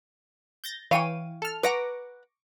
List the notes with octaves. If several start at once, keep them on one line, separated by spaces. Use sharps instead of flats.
G6 A6 A#6
E3 C#5 F5 G5 D#7
A4 F6
B4 F#5 A#5 C#6 D6 A#6